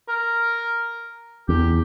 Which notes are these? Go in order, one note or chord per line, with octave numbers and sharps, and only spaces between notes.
A#4
E2 G4